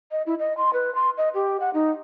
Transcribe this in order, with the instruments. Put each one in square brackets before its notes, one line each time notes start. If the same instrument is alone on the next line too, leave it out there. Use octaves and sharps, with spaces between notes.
[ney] D#5
E4
D#5
C6
B4
C6
D#5
G4
F#5
D#4